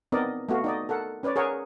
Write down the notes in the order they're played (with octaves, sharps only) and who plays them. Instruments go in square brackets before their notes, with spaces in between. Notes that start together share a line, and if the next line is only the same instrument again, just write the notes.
[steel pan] B3 C4 D#4 A#4 D5 D#5
A3 B3 F#4 F5
D#4 D5 D#5
A4 A#4 F#5
C#4 B4 C#5 D5
G#4 A#4 C#5 F#5